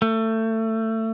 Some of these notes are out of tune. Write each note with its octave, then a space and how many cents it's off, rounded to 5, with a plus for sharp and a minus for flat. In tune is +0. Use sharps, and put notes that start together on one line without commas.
A3 +25